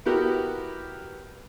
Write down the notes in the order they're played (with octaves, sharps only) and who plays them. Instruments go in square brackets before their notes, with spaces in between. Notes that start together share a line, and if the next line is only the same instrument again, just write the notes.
[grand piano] B3 E4 F#4 G4 A#4